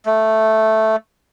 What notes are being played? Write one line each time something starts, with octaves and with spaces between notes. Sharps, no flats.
A3